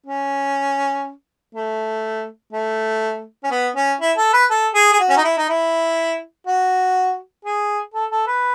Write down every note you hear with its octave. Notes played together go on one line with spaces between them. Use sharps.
C#4
A3
A3
C#4
B3
C#4
E4
A4
B4
A4
G#4
G#4
F#4
C#4
D#4
E4
D#4
E4
F#4
G#4
A4
A4
B4